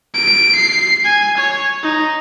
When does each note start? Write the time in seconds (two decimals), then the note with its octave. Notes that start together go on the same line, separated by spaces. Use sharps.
0.14 D7
0.55 C7
1.04 G#5
1.37 C#5
1.83 D#4